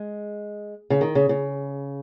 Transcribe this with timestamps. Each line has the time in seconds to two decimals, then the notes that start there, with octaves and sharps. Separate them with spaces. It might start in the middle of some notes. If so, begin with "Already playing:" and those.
Already playing: G#3
0.90 C#3
1.01 D#3
1.15 C#3
1.29 C#3